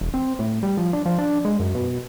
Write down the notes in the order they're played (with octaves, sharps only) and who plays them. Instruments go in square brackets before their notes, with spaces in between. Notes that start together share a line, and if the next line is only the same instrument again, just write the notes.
[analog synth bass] E1
C4
A2
G3
F3
D4
F3
D4
G#3
F#2
B2